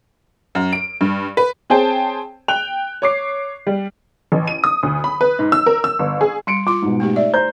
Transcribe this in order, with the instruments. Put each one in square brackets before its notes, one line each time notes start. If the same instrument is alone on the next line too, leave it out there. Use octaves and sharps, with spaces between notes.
[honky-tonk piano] F#2
D7
G2
B4
C4 G#4 C5 C#5 G5 A5
G5 F#6 F7
C#5 D6 C7
G3
A1
D#7
D#6
D2
B5
B4
G#2
E6
A#4
E6
G1
G#4
[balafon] G3 [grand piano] C6 C#7 D7
[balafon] F4 C6 [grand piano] D6
[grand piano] G#2 B2
[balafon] A3 D#4 G4
[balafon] D5 [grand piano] E5
[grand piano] C5 A#5 G6